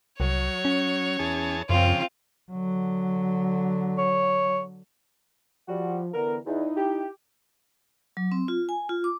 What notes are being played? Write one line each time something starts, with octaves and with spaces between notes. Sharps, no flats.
C2 F#3 C#5
C#4
E2 G#4 A5
F#2 C#3 F3 C4 F4
D3 F#3
C#5
F3 G3 F#4
D3 E3 B3 A#4
E2 D#4 E4
G4
F#3
C4
F4
G#5
F4
D6